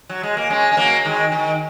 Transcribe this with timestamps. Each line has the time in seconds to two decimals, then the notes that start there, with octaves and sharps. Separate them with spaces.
0.09 F#3
0.23 G#3
0.37 A#3
0.50 G#3 C#4
0.72 C#4
0.77 F#3 A#3
1.05 D#3 G#3
1.32 D#3